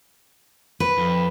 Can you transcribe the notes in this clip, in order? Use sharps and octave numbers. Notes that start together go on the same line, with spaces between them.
B4
F2